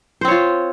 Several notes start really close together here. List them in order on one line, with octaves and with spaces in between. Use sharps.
C5 C4 C#5 F4